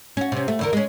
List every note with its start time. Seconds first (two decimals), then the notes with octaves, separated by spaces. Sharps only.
0.17 C#4 F#4
0.32 C3 C#4
0.48 A3
0.59 E2 D3 A#4
0.73 G#3 C#4